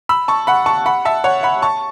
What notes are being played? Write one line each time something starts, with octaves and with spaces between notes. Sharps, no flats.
B5 E6
A5 C#6
F#5 B5
A5 C#6
F#5 B5
E5 A5
C#5 F#5
F#5 B5
A5 C#6